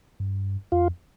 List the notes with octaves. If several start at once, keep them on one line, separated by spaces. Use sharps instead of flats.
G2
F2 F4